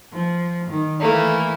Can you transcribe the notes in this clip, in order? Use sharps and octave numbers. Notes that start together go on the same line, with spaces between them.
F3
D#3
E3 A3 A#3 E4